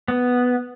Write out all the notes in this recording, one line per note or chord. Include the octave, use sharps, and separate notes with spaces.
B3